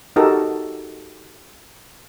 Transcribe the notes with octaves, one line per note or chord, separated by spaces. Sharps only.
D#4 F#4 G4 A4 A#4